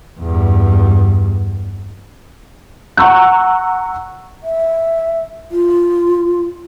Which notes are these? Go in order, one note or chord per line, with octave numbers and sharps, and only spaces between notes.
E2 G2
F#5 A#5 C#6 E6 F#6
E5
F4